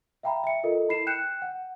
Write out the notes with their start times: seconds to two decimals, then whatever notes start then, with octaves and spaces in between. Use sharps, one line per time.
0.23 E5 F5 G5 A#5 B5
0.44 E5 C#7
0.63 F4 A4 A#4 D#5 E5
0.88 E4 B5 C7 E7
1.07 G5 F#6 G6 C#7 E7
1.42 F#5